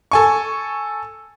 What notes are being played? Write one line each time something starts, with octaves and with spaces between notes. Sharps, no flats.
A4 G#5 C#6